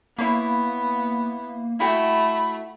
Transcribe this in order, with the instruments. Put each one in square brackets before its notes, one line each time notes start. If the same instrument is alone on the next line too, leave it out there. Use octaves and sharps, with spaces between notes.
[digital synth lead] A#3 [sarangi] B3 [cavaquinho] E4 C#5 B5
[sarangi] A3 [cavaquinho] E4 F#4 G5 [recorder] B5